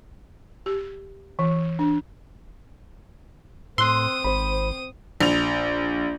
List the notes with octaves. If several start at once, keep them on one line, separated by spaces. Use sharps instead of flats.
G4
E3
D4
A2 C4 C6 D#6 E6 F#6
G#1 C5 B5
A#1 F7